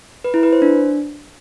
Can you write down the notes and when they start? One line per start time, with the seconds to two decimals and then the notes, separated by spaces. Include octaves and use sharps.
0.24 B4
0.34 E4
0.43 B4
0.53 C5
0.62 D4